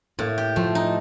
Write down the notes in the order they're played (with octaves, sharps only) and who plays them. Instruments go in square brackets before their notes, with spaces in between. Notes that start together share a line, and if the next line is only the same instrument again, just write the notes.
[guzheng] A2 [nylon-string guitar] A#3
[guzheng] G4
[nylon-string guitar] F3 [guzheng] A3
[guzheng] D#4